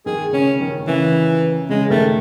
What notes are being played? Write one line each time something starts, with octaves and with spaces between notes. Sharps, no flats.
D#3 G#4
C#3 C#4
D#3
C#3 E3
C#3 G#3
D#3 A3